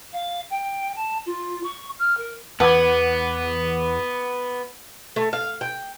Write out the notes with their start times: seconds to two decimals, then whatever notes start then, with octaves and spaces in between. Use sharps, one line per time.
0.12 F5
0.49 G5
0.95 A5
1.25 F4
1.63 C#6
1.98 F6
2.17 A#4
2.60 E2 B3 B4 F#5 D6 G#6
5.16 A3
5.33 F5
5.61 G5